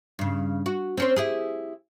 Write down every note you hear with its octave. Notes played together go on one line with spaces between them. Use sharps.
G2 C#3
F#4
C4 C#4 C5
E4 G4 G#4